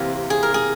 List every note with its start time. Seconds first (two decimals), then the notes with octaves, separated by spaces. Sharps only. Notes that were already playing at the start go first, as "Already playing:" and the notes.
Already playing: C3 E3 A#3 A#4
0.30 G#4
0.43 A#4
0.54 G#4